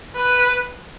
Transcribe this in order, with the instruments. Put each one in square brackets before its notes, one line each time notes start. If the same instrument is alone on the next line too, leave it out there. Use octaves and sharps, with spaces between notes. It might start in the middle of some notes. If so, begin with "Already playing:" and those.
[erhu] B4